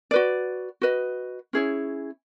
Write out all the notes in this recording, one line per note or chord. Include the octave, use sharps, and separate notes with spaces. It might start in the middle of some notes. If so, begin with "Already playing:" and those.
F#4 B4 D5
F#4 B4 D#5
C#4 E4 G#4 C#5